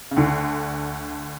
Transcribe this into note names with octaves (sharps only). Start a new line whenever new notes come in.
C#3
D2 D3